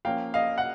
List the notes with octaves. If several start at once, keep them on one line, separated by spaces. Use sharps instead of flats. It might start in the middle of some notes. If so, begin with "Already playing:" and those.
F3 A#3 C#4 F5 G5
D#5 F5
F#5